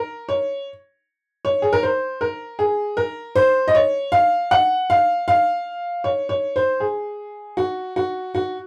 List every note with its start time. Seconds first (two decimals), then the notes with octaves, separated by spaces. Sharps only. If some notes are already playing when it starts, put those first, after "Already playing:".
Already playing: A#4
0.29 C#5
1.45 C#5
1.62 G#4
1.73 A#4
1.83 C5
2.21 A#4
2.59 G#4
2.97 A#4
3.36 C5
3.68 D#5
3.75 C#5
4.12 F5
4.51 F#5
4.90 F5
5.28 F5
6.04 C#5
6.29 C#5
6.56 C5
6.80 G#4
7.57 F#4
7.96 F#4
8.35 F#4